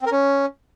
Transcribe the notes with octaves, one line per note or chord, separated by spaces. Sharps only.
C4
A#4
C#4